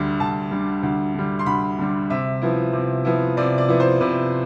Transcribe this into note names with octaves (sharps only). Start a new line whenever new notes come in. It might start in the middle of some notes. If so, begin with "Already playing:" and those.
Already playing: D2 D3 G3
D2 A5
D3 G3
D2
D3 G3
C6
D2 B5
D3 G3
C3 E5
F3 B3 E4
C3
F3 B3 E4
C3 D5
D5
F3 B3 E4
C5
C3 B4